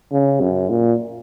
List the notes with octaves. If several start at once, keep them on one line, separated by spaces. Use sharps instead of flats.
C#3
F#2
A#2